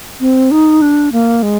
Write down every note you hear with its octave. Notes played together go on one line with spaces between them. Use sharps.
C4
D#4
D4
A#3
G#3